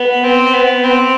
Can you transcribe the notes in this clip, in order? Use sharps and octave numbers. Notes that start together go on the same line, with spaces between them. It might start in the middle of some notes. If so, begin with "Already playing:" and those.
Already playing: B3
C4
B3
C4